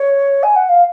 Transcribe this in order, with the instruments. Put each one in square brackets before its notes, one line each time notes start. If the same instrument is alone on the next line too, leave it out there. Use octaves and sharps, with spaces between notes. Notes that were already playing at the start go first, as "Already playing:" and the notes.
Already playing: [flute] C#5
G#5
F#5
F5